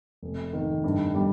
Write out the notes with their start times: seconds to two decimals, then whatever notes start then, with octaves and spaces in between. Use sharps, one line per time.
0.22 F1
0.53 D#3
0.84 G2
1.15 G3